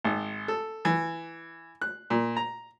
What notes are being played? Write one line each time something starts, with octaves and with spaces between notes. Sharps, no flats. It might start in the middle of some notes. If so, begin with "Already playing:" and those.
G#1
A4
E3
F#6
A#2
A#5